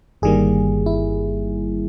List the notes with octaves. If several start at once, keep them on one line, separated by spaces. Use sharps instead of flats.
G1 G2 D#3 G3 A#3 G#4
E4